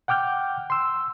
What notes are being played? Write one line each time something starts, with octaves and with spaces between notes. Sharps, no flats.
F#5 G5 D6 F6 G6
C6 E6